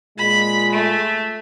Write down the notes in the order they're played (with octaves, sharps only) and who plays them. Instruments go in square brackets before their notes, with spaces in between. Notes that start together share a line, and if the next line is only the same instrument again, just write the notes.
[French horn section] A#2 G#3 F4 [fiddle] B5
[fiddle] A3